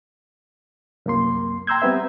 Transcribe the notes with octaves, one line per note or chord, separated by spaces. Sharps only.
C2 F#2 A#3 C6
G5 A#5 C6 E6 G6 G#6
G3 B3 C4 B4 E5